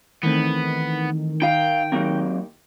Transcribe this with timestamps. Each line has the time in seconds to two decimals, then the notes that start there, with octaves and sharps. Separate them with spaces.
0.23 D#3 E3 A3 B3 C4
1.42 D#4 F5 G5
1.92 F#3 A#3 C4 D#4 G4 A#4